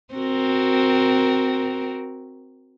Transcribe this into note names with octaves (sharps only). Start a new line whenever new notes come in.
C4 F#4 A#4